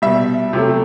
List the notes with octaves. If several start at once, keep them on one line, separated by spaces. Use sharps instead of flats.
B2 G3 E5
C3 F#3 A3